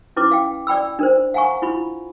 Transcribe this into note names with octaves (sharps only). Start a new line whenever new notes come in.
C#4 E4 B4 D6
F5 G5
D5 G5 B5 E6
D4 A#4 C5
F5 F#5 G#5 A#5 C#6
E4 F4 B5